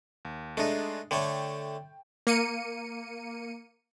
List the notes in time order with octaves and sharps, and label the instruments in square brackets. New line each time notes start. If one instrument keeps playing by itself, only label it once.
[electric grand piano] D#2
[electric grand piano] G#3 D4 [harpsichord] A3 D#4
[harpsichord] D3 A3 C#5 [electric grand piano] G5
[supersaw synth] A#3 C#7 D#7